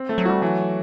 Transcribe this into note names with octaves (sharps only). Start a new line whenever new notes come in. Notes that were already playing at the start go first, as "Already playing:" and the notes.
Already playing: C4
A3
F#3
G3 F#4
E3 F#3